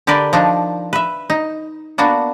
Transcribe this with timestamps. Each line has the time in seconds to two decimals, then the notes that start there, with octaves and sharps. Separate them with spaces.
0.07 D3 G4 A#4 B4 D5
0.33 F3 D4 D#4
0.93 B4 E5
1.30 D#4
1.98 A#3 B3 D4 F#4